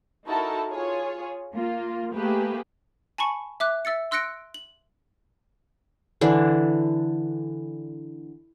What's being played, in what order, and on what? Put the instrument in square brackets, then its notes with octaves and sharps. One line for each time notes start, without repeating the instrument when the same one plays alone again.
[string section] D#4 E4 F#4 A4 A#4 A5
F4 G#4 C#5
A#3 F4
A3 A#3 G4 G#4 B4
[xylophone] G#5 A5 B5 C#6 C#7
E5 D6 F#6
E5 E6 A6 C#7
C6 E6 F#6 A#6 C#7 D7
F#7
[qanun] D3 E3 D4